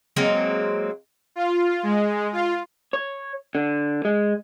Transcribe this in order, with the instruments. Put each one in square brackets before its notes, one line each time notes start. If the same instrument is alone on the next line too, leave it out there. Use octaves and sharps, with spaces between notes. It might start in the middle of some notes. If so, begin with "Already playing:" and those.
[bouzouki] F#3 G#3 A#3 C4
[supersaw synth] F4
G#3
F4
[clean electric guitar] C#5
D3
G#3